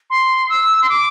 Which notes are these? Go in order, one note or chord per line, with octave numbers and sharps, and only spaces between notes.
C6
E6
C6
D6